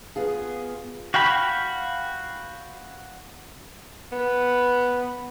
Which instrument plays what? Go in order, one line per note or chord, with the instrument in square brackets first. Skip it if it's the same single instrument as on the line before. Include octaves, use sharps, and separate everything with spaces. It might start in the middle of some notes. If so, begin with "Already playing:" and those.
[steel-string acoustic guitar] B3 F4 G#4
[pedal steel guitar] F#4 F5 G5 B5
[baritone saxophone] B3